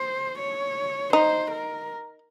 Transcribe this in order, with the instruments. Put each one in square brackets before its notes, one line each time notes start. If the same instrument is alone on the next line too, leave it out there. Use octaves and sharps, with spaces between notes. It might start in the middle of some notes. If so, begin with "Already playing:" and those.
Already playing: [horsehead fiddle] C5
C#5
[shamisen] D#4 [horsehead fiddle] C5
[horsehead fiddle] A#4